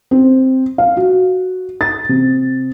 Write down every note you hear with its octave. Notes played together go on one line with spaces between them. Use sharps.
C4
F5
F#4
A6
C3